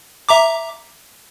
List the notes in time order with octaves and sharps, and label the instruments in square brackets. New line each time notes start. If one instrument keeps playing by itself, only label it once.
[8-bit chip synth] E5 A#5 D6